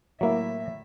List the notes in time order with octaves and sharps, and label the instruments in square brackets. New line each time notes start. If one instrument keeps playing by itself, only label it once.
[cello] A2 E5 [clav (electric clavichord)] F#3 A#3 E4